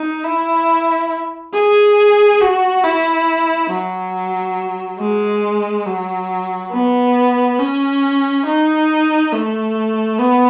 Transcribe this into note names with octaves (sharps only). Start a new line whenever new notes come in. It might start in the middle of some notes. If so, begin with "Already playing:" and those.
Already playing: D#4
E4
G#4
F#4
E4
F#3
G#3
F#3
B3
C#4
D#4
A3
B3